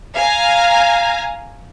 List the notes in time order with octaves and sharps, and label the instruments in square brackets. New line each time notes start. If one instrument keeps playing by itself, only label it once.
[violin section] F5 G#5 A#5